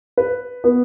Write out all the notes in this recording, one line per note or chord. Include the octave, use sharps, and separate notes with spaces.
B4
B3